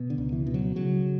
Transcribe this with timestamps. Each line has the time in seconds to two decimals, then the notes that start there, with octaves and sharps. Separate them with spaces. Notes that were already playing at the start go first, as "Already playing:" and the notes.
Already playing: B2
0.10 D3
0.18 C#2
0.33 E3
0.47 B2
0.54 F#3
0.76 C#3 F#3